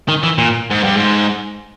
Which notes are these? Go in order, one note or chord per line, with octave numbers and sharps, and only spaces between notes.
D#3
E3
A#2
G#2
G2
G#2